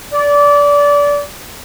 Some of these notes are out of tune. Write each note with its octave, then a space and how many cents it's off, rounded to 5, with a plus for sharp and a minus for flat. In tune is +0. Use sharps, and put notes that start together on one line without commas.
D5 -25